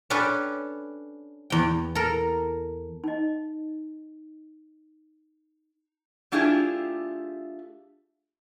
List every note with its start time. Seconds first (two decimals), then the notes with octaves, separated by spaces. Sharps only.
0.10 C#4 D4 G4 A4 B4
1.50 E2 G5
1.95 A4 A#4
3.04 D#4 D#5
6.32 A3 D4 E4 F4 G4 G#4